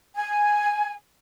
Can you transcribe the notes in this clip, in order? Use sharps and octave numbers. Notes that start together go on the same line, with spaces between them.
G#5